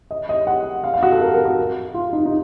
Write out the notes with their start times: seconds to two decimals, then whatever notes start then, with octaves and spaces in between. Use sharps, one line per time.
0.11 D#5
0.29 D#5
0.47 F#5
0.84 F5
0.94 F5
1.03 F#4
1.12 A4
1.21 A#4
1.34 A#4
1.46 F#4
1.94 F4
2.13 D#4
2.25 D#4